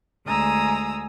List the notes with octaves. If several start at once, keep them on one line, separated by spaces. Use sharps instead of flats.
D2 G#3 G#5 A#5 D#6 E6